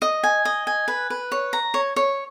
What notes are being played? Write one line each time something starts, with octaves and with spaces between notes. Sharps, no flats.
D#5
G#5
D#5
G#5
B4
B4
C#5
A#5
C#5
C#5